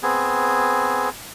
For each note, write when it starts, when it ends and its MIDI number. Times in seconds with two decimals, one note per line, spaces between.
0.03 1.09 59
0.03 1.09 60
0.03 1.09 68